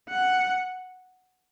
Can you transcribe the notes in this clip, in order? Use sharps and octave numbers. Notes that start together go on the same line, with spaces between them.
F#5